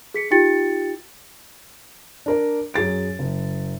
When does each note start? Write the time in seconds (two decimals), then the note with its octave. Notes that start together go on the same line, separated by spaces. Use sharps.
0.14 G#4 B6 C#7
0.31 D#4 F4 G4 G5 A6 C#7
2.26 D4 A#4 D5
2.74 F#2 G#4 A6 D7
3.19 F#1